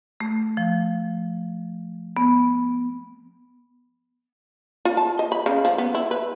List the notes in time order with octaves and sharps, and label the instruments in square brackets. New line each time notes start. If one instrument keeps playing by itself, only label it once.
[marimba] A3
F3
B3
[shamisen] F4
A5
D#5
B5
C#3
F3
B3
E4
B4